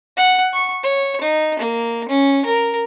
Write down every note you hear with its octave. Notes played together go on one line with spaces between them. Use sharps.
F#5
C#6
C#5
D#4
A#3
C#4
A#4